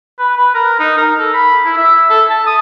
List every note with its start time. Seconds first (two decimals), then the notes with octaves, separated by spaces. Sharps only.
0.19 B4
0.37 B4
0.54 A#4
0.79 D#4
0.97 A#4
1.19 A4
1.34 B5
1.65 E4
1.77 E5
2.10 A4
2.30 A5
2.46 D#6